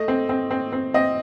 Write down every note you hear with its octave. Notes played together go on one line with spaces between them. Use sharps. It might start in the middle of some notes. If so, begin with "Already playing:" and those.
Already playing: A3 D#5
C4
C4
C4
C4
C4 D#5